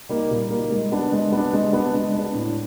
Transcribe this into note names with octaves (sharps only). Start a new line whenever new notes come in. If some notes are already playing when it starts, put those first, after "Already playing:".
G3 A#3 D#4
A#2
G3 A#3 D#4
G#3
B3 D4
G#3
B3 D4
G#3
B3 D4
G#3
B3 D4
A2